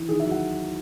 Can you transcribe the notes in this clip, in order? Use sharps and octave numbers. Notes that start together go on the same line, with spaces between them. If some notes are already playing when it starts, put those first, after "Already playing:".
Already playing: E3
D#3 G#4
E5
F#3
F#5